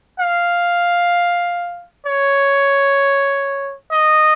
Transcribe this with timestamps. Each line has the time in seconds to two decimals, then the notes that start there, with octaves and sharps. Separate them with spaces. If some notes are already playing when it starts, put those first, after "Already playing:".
0.19 F5
2.06 C#5
3.92 D#5